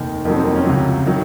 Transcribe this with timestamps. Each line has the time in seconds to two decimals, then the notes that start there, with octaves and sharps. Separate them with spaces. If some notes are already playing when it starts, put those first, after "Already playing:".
Already playing: F1 D#2 D#3
0.25 F2 D#3 F#3 A#3
0.36 C4
0.45 A#3
0.55 C#4
0.66 C#2 C3 F#3
1.07 D#3 F#3